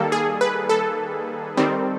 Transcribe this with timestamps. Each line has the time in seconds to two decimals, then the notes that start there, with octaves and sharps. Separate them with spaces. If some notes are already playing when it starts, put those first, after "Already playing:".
Already playing: D#3 G3 A#3 A4
0.12 G#4
0.41 B4
0.69 A4
1.57 D#3 G3 C4